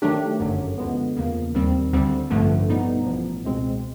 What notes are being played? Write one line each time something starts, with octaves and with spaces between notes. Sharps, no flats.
D#3 F#3 A3 D4 G4
G1 F#2 D3 F#3
D2 D3 F3 G#3 B3
E2 C#3 F3 A#3
D#2 D#3 G3 C4
D2 D3 G3 C4
A1 G2 D3 F3 A3
B2 G3 B3 D#4
A1 A2 F3
C#2 B2 G#3 C4